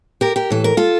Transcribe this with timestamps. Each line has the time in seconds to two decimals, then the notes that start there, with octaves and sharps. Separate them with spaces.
0.21 G4 A#4
0.36 G4 A#4
0.50 A2 E3 A4
0.64 A#4
0.77 F4 A4